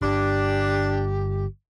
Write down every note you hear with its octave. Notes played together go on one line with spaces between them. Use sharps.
G1 D4 G4